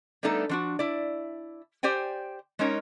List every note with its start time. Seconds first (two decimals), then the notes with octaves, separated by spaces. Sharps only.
0.23 G3 A3 B3 D4 D#4 A4
0.49 F3 D4 F#4
0.79 E4 D5
1.83 G4 C5 D5 G5 G#5
2.59 G#3 C#4 D#4 A#4 C#5